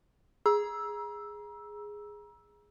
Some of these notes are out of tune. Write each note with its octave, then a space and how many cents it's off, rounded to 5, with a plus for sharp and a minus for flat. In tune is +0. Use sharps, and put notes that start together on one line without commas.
G#4 +0 A#5 +35 E6 +0